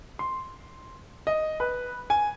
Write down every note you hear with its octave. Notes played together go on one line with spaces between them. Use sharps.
C6
D#5
B4
G#5